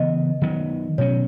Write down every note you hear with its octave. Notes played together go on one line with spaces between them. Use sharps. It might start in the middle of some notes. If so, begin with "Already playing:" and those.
Already playing: C#3 E3 B3 D#5
D#3 F#3 B3
B2 F#3 C#4 C#5